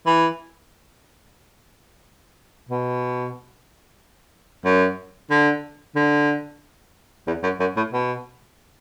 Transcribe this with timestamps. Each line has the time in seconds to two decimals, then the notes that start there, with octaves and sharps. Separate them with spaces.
0.06 E3
2.69 B2
4.65 F#2
5.30 D3
5.95 D3
7.27 E2
7.43 F#2
7.60 F#2
7.76 A2
7.92 B2